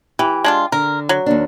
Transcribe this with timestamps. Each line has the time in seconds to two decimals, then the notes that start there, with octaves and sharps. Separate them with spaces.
0.19 E3 G4
0.44 G#3 D4 F4
0.72 D3 A#4
1.09 F#3
1.26 D#2 A#3 D4